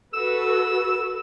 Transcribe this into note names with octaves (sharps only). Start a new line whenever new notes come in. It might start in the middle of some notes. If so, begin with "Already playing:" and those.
F#4 A4 B4 E6